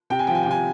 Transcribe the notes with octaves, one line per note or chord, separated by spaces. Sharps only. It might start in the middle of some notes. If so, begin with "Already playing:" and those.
C3 G5
G#5
F3 G5
G#5
G5
C3 G#5